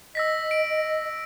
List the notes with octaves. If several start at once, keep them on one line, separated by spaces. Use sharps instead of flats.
D#5 E6 A#6 B6
D7